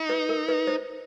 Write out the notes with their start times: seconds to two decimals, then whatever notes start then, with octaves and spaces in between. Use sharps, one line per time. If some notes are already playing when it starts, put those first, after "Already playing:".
Already playing: D#4
0.09 B4
0.29 A#4
0.49 B4
0.67 C5